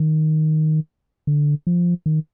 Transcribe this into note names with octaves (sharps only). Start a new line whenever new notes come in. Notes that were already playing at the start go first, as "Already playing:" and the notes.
Already playing: D#3
D3
F3
D#3